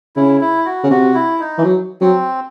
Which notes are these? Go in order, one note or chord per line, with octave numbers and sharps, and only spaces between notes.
C#3 E4
E4
F#4
C#3
C3 F#4
E4
D#4
E3
F#3
F#3 C4